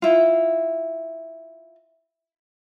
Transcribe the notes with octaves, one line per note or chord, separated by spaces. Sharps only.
E4 F4